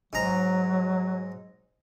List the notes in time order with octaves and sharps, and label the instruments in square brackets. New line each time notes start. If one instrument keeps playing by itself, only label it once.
[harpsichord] G#2 A#5 [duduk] F#3